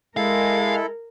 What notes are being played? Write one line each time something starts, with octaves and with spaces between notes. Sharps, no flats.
G#3 E4 A4 A#4 F5